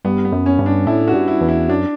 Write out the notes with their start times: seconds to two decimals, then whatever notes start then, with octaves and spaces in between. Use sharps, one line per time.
0.05 G2 B3
0.25 B3
0.32 F#2
0.46 C#4
0.59 G2
0.66 D4
0.87 A2 E4
1.08 F#4
1.14 G2
1.28 E4
1.41 E2
1.48 E4
1.69 F#2 D4